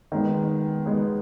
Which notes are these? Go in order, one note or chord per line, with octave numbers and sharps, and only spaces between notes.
D#3 G#3 B3
D#3 G#3 B3